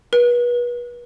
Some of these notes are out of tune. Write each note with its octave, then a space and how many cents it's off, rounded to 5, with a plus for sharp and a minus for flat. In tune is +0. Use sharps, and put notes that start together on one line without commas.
B4 -35